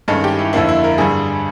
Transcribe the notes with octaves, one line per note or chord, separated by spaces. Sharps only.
G2 D#3 G#3 C#4 A4
G4
E4
F2 D3 F3 A#3 E4
E4
A#4
G2 D3 G3 G#4